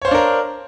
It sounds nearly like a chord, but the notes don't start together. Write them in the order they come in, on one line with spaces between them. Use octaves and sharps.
C#5 C5 F5 D4 A#4